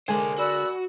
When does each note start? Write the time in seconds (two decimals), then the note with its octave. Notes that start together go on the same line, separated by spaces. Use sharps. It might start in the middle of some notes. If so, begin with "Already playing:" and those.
0.08 D3 G#3 A#3 C5 D5 G#5
0.38 F#4 D5 B5 E6